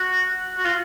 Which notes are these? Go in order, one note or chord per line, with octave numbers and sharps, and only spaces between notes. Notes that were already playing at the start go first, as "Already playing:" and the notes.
Already playing: F#4
F#4
F4